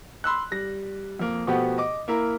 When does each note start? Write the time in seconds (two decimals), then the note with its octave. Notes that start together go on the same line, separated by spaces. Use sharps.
0.24 B5 C6 E6 F#6
0.52 G3 A#6
1.19 F2 A#3
1.47 B2 F3 A3 B3 F#4 G4
1.78 D#5 D6
2.08 A#3 E4 A#4